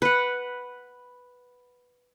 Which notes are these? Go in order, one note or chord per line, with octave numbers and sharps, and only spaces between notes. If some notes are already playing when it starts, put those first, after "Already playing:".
B4 F#5